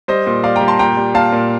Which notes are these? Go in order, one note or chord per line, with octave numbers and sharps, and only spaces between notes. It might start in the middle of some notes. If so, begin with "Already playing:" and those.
G3 C5 D#5
A#2
G3 D5 F5
G5 A#5
G3
A5 C6
A#2 G5 A#5
G3
A#2 F5 A5
A#2